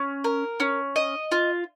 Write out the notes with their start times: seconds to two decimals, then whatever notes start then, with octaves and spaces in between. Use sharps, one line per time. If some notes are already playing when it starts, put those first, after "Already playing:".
Already playing: C#4
0.24 A#4
0.60 C#4
0.96 D#5
1.32 F4